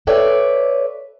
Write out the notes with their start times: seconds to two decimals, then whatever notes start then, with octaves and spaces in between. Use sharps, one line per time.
0.07 A4 B4 C#5 D5 E5 G5